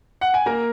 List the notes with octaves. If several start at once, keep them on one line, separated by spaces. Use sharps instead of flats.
F#5
G#5
A#3 A#4 A#5